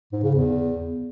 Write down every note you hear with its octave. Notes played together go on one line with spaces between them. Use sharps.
G#2
C#3
E2